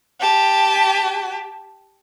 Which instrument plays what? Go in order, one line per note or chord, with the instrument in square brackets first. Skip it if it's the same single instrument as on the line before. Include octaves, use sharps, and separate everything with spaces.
[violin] G4 A5